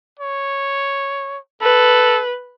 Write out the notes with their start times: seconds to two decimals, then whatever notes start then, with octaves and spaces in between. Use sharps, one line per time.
0.19 C#5
1.62 A4 B4